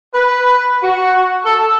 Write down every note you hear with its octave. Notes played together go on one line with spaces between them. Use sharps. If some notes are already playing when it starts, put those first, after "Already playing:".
B4
F#4
A4